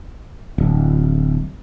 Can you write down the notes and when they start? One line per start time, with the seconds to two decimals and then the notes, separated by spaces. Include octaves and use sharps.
0.58 D1